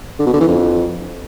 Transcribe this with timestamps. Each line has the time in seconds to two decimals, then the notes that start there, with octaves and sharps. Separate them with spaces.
0.19 D3
0.26 B2
0.33 D3
0.41 E3
0.48 F2